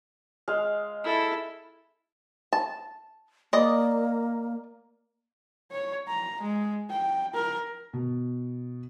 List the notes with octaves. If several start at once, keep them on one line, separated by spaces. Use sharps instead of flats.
G#3 F5
E4 A4
A5
A#3 D5 D#5
C#5
A#5
G#3
G5
A#4
B2